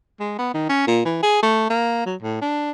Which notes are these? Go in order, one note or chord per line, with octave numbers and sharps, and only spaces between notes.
G#3
B3
D#3
C#4
A#2
E3
G#4
A3
A#3
F#3
A2
D4